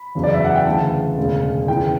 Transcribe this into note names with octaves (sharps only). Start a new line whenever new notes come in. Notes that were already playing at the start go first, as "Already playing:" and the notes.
Already playing: B5
E2 C#3 F#3
D5
E5
F#5
G5
D2 C#3 E3 A5
E1 D2 C#3
E2 C#3 E3 G5